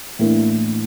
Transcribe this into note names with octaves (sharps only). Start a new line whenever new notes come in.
A2 E3 A#3 D4